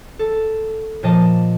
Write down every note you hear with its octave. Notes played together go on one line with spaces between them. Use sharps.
A4
A#2 F3 D#5 A5